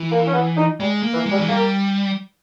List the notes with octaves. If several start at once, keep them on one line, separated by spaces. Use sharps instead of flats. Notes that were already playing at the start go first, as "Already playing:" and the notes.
Already playing: E3
A#3
C#4
B3
D#4
G3 G#3
A#3
E3
G#3
G3
E3
G3 A#3